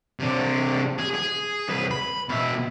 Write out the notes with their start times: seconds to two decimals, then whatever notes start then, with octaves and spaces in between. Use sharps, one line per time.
0.20 C3 D4
0.99 G#4
1.14 G#4
1.69 C2 B4
1.91 B5
2.29 B2 E5